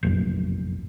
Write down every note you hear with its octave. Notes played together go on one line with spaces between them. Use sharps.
F1 A#1 F#2